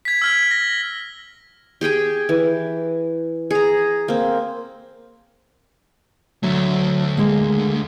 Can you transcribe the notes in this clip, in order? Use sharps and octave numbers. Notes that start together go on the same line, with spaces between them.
G#6 B6
E6 F6 G#6
A#6
G4 G#4 G5 G#5
E3
G#4 A#5
A#3 C4
D2 F#3 A3
G#3 A#3